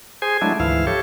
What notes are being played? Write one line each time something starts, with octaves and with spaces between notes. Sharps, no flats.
G#4 C5 G#5
F#3 G#3 A3 D4 E4
D2 G#2 E3 F3 E4 F5
G4 A4 C#5